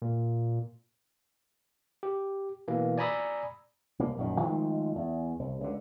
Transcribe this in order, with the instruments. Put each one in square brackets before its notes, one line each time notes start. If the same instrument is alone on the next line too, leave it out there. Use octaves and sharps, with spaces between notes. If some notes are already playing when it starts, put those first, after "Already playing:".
[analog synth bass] A#2
[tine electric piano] G4
B2 E3 A#3
D5 G#5 A#5 B5 D#6 E6
[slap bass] C2 A#3
A#1 F#2 D#3
D#3 F3 G#3 A3
E2
C2
C#2 D3